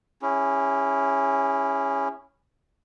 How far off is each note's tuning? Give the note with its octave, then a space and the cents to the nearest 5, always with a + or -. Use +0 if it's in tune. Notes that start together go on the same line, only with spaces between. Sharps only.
C#4 +0 E4 +0 G#4 -40